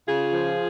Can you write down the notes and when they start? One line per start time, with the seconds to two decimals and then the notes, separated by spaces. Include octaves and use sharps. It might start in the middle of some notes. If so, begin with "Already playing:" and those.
0.08 C#3 F4 G#4
0.33 F3